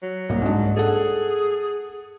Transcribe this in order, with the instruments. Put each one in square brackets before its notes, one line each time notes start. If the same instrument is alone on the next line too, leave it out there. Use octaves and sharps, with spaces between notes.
[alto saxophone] F#3
[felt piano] C2 A#3
G#2 D4
[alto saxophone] G#4 [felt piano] A4 F#5